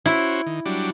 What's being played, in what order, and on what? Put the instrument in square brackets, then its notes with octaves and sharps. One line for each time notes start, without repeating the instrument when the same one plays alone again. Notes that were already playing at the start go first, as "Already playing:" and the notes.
[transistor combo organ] C#4 F#4 C5 [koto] E4
[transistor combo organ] D#3
F#3 G3 D4